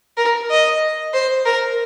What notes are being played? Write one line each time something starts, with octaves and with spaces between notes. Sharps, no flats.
A#4
D#5
C5
A#4